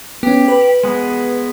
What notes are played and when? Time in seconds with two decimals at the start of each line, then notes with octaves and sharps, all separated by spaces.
0.23 B3 C#4 G4
0.48 B4
0.83 G#3 B3